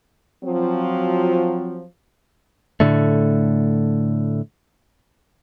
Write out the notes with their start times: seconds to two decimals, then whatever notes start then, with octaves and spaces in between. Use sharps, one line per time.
0.44 F3 F#3 C4
2.80 A2 D3 A3